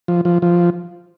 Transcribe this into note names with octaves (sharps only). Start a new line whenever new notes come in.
F3
F3
F3